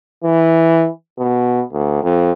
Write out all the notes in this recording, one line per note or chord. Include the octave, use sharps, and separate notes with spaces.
E3
B2
D2
F2